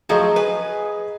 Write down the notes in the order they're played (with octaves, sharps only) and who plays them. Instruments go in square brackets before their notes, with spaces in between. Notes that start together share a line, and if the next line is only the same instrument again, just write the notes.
[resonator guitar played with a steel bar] F3 F#3 A3 [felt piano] G#4 D#5
[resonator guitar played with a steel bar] B4 G#5